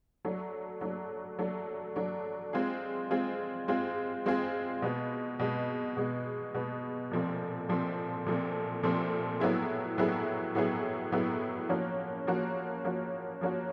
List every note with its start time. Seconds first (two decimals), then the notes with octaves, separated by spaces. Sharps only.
0.25 F#3 A3 D4
0.81 F#3 A3 D4
1.39 F#3 A3 D4
1.96 F#3 A3 D4
2.53 G#3 C4 F4 G#4
3.11 G#3 C4 F4 G#4
3.68 G#3 C4 F4 G#4
4.26 G#3 C4 F4 G#4
4.82 B2 G#3 B3
5.39 B2 G#3 B3
5.97 B2 G#3 B3
6.54 B2 G#3 B3
7.11 A#2 F3 A3 C4
7.69 A#2 F3 A3 C4
8.26 A#2 F3 A3 C4
8.83 A#2 F3 A3 C4
9.40 A2 F#3 B3 E4 G#4
9.98 A2 F#3 B3 E4 G#4
10.55 A2 F#3 B3 E4 G#4
11.12 A2 F#3 B3 E4 G#4
11.69 F3 A#3 C#4 F#4
12.27 F3 A#3 C#4 F#4
12.84 F3 A#3 C#4 F#4
13.41 F3 A#3 C#4 F#4